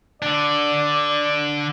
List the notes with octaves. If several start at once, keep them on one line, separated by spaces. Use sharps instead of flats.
D3 D4 D5